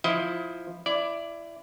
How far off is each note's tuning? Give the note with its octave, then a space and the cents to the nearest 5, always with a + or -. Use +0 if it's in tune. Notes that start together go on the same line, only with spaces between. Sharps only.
F3 +0 E4 +0 D#5 +25
E4 +20 D5 +0